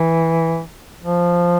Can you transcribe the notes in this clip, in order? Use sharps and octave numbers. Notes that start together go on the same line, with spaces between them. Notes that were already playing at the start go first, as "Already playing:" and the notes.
Already playing: E3
F3